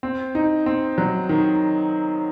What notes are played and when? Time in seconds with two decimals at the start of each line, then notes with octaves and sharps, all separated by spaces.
0.03 C4
0.35 D#4
0.66 C4
0.98 F#3
1.29 D#3